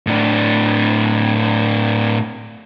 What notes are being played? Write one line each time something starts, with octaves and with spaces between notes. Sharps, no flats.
A2 D4